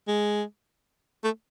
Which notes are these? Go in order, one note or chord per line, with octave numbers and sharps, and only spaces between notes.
G#3
A3